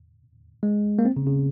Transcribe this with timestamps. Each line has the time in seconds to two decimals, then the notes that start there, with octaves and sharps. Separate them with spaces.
0.63 G#3
0.99 A#3
1.05 C4
1.17 C#3
1.27 C#3